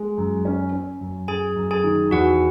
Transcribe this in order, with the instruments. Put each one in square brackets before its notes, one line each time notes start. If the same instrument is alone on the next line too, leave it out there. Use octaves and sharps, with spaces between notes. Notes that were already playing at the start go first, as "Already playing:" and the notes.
Already playing: [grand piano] G#3
F#2
C#4
C#4
F#2
[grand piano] F#2 [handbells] G#4 G#5
[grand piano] F#2
[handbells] G#4 G#5
[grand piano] D#3
[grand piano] E2 [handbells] F#4 F#5